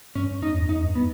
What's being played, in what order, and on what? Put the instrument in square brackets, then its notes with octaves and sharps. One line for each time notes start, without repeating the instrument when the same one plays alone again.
[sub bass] G2 [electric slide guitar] C#4
[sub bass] E2 [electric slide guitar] D#4
[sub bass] E2
[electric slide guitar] D#4
[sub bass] G2
[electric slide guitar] B3